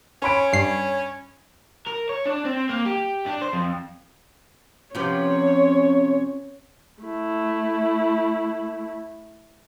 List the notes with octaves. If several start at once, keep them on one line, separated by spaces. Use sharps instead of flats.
C#4 C#5 B5 D7
G2 C7
A#4
C#5
D4
C4
A#3
G4
D4
C5
F2
C3 F3 B3 C#4 C#5
A3 E4